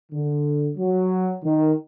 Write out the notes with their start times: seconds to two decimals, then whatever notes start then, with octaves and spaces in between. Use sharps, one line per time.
0.11 D3
0.77 F#3
1.43 D#3